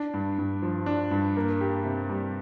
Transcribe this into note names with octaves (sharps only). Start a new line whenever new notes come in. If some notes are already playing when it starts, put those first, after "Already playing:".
Already playing: D4
G2
G2
F3
D4
G2
A#3
G4
C3
G3